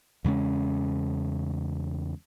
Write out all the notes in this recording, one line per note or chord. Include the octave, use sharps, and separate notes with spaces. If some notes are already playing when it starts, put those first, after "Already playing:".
E2 C#3 G#3 C#4